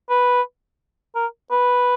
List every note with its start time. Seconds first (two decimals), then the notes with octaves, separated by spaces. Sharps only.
0.10 B4
1.15 A#4
1.51 B4